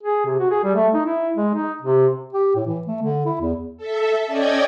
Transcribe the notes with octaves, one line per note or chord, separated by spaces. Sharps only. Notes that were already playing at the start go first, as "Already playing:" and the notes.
G#4
C3
F#4
G#4
G3
A3
D#4
E4
G#3
D#4
C3
G4
A2
E3
A3
D3
E4
E2
A4 E5
C#4 D5 D#5 G5 G#6